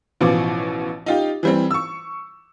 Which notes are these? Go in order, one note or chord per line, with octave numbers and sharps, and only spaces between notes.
A1 B2 E3 F3 D6
D#4 F4 G4
E3 G3 C4
C#6 E6